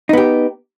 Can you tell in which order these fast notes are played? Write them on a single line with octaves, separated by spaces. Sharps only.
D#4 B3 G4